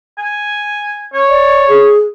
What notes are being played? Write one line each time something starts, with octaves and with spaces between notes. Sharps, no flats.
G#5
C#5
D5
G#4